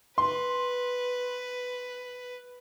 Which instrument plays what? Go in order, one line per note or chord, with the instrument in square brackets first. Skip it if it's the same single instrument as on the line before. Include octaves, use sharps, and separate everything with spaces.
[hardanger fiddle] B4 [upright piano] C6